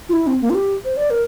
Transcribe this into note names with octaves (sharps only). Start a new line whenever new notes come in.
F4
E4
C4
A#3
F4
G4
C5
D5
A#4